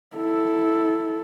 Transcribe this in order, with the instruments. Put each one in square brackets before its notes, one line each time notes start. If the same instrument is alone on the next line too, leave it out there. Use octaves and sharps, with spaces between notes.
[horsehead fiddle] E4 A4